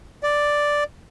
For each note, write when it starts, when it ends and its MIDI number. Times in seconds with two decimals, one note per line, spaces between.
0.23 0.84 74